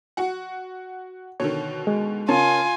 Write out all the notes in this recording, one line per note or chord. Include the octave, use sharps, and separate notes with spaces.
F#4 F#5
B2 D3 D#3 C#5
G#3
C#3 F4 A#4 C#5 G#5 A5